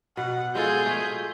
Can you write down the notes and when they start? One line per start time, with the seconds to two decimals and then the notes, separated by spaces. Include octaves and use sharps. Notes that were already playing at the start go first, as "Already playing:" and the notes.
0.17 B2 F#5
0.55 G#3 F4 G#4 A4 G6
0.86 A3